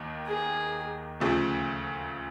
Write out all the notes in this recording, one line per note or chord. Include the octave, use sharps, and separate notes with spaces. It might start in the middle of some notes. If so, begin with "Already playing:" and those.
Already playing: D#2 D#3
G#4
D2 C#3 F3 A3